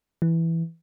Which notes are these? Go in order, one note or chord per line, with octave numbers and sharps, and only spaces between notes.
E3